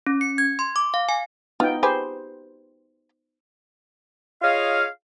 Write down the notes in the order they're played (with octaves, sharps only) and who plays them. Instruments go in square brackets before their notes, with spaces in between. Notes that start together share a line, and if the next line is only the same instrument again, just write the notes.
[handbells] C#4
C#7
G#6
C6
D6
F5
G#5
[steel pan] B3 D#4 G5 [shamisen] F4
[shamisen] G4 G#4 B4 [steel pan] C5
[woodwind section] F4 G#4 C#5 D#5 F5